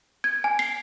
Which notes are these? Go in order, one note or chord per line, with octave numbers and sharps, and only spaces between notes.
G#6
G#5
C7